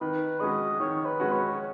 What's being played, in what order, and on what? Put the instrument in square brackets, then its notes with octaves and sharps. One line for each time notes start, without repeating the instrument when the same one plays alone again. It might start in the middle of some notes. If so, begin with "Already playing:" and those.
[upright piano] D#3 [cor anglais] B4
[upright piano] G#3 C#4 F#4 [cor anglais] D#5
[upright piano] D#3 [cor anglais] C#5
[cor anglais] B4
[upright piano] G#3 C#4 F#4
[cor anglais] C#5